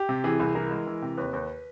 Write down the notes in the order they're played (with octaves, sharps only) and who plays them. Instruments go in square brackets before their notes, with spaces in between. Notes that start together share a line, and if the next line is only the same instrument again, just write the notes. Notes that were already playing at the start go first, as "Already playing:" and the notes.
Already playing: [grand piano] G4
C3
E3 G#4
C2
E3 A#4
G#3
E3
C3
D#2 B4
D#2